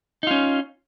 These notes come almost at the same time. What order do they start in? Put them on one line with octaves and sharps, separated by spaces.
D#4 F4 C#4